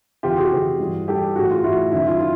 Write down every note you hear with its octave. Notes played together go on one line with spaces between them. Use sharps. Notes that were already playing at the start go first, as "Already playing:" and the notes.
F2 C3 E3 F4 G4
F#4 G#4
F2 C3 E3
G2 E3
G2 E3 G4 A4
A2 E3 F#4 G#4
F4
A2 E3 E4 F#4
F#2 D#3 E4
F4
F4